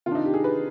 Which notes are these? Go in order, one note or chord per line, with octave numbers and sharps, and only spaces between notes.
C3 D#3 D4 F4
D#4
G4
G#4
B4